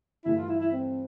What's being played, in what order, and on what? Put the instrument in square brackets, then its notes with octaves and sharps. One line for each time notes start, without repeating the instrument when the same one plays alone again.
[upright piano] G2 E3 A3 [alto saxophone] E4
[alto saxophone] F4
E4
E4
C4